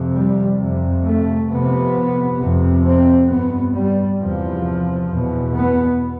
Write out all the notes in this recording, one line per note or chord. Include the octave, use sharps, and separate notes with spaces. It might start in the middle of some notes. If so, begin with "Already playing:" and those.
Already playing: F2 C3
G3
F2 C3
A3
F2 C3 B3
F2 C3
C4
G2 B3
G3
E2 C3 F3
E2 B2
B3